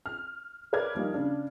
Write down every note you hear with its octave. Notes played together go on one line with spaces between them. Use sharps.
F6
A#4 B4 C#5 D5 F6 G#6
F3 G3 A#3 D#4
C#3 D4